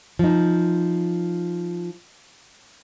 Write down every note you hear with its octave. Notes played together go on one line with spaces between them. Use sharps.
F3 D#4